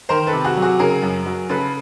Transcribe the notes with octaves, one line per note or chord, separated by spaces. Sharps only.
D#3 A#4 C5
A4 B4
C3
F#4 G#4
F#3
F#4 G#4
C#3 G#4 A#4
F#2
F#3
C#3 A4 B4